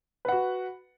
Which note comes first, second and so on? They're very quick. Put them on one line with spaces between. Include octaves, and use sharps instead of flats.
B4 F#5 F#4